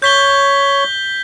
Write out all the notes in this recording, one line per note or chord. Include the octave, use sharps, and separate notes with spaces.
C#5 G6 B6 G7